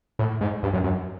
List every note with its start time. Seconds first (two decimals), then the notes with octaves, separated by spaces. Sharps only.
0.19 A2
0.41 G#2
0.63 G2
0.73 F#2
0.84 F#2